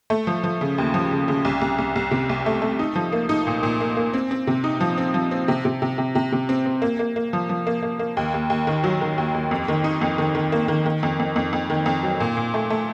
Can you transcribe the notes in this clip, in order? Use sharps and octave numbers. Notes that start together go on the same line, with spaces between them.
A3
F3
F3
C#3
D#2
F3
C#3
C#3
C2
C2
C2
C2
C3
C2
A3
A3
D#4
F3
A#3
D#4
A#2
A#2
A#3
A#3
C4
C4
C3
D#4
F3
C4
F3
C4
C3
C3
C3
C3
C3
C3
C4
C4
A#3
A#3
A#3
F3
F3
A#3
A#3
A#3
D#2
D#2
D#2
D#3
F#3
D#3
D#2
D#2
F2
D#3
D#4
F2
D#3
D#3
A#3
D#3
D#3
F2
F2
F2
F2
D#3
F2
F#3
A#2
A#2
A3
A3